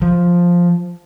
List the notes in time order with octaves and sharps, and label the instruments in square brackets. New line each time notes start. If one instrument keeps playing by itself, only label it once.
[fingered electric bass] F3